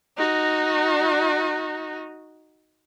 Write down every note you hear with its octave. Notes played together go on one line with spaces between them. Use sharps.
D#4 F#4